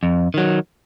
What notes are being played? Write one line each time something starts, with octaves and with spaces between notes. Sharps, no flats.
F2
D#3 F#3